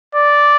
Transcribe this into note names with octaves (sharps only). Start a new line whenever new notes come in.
D5